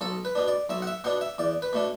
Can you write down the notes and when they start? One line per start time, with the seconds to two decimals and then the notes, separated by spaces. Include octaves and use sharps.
0.01 B1 A4
0.25 B4
0.35 B2 B3 D4
0.48 D5
0.69 B1 E5
0.82 F#5
0.87 E5
1.04 B2 B3 D4 F#5
1.21 E5
1.38 E2 D5
1.62 B4
1.73 B2 A3 D4